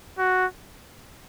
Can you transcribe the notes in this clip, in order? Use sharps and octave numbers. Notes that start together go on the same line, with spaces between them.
F#4